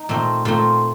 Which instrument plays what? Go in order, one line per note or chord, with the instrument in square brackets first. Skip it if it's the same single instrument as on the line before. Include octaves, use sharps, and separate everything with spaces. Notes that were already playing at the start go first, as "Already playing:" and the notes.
Already playing: [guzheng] D#4
A#2 A3 C4
A#2 A3 C4 F4